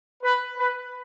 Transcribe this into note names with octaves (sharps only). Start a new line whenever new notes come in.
B4
B4